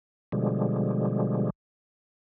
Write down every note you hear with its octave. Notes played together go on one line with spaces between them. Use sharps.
B2 D3 F3 G3 G#3